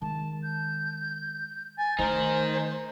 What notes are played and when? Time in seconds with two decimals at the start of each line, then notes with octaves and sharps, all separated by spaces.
0.02 D#3 G#3 A5
0.43 G6
1.78 G#5 A6
1.99 D#3 A3 D#4 A#4 C5 G#5